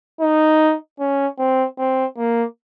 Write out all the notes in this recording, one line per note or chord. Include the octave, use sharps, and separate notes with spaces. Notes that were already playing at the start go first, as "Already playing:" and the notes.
D#4
C#4
C4
C4
A#3